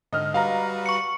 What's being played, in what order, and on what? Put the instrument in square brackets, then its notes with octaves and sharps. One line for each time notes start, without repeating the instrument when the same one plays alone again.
[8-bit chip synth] G#2 D3 [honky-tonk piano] D#5 F6
[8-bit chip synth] G3 F#4 B4 [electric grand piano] F5 A#5
[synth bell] C#6 C#7